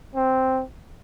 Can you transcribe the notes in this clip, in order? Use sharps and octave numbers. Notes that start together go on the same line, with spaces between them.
C4